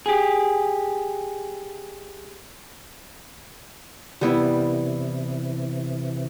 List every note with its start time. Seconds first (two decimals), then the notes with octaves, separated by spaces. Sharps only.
0.06 G4 G#4
4.21 C3 E3 G3 B3 E4